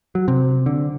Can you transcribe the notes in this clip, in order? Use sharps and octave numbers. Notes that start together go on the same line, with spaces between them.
F#3
C3
D3